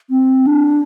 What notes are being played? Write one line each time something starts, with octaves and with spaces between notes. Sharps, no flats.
C4
D4